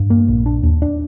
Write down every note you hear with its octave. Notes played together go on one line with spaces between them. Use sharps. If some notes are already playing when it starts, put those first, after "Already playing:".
Already playing: G2
A#3
A#1
D4
D#2
D4